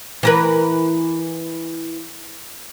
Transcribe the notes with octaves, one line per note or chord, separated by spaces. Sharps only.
E3 A#4 B4